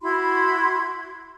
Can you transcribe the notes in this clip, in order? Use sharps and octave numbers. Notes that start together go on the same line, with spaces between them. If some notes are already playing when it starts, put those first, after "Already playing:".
E4 F#4 B5 C6